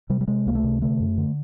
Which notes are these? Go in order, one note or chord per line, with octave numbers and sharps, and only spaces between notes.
C3 G3
G3
C3 G#3
C#2 A#3
A3
C3
D3 A3
F#2
D3